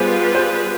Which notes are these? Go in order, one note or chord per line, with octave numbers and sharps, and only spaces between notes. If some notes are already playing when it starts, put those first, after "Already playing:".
Already playing: G3 B3 F4 G#4 B4 C5
G#4 C5